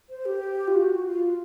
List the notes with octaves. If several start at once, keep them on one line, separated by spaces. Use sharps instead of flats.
C5
G4
F4
F#4
F4